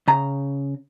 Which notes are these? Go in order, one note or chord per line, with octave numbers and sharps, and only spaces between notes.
C#3 A#5